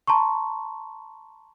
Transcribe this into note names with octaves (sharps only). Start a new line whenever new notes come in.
A5 A#5 C6 C#6